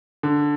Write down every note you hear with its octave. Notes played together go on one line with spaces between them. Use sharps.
D3